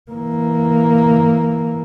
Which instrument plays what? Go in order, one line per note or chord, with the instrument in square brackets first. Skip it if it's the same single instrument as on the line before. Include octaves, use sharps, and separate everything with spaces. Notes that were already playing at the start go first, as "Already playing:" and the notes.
[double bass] E3 A#3